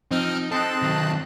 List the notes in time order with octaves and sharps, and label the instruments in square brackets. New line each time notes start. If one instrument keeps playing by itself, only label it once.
[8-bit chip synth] F3 C4 F6 [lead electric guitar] D#4
[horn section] C4 D#5 [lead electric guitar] A4 [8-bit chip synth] A5 F#6
[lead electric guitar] D#3 F#3